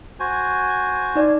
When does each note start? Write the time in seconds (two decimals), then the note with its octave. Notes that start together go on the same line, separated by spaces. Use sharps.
0.20 F#4 C5 G#5
1.15 D#4 D5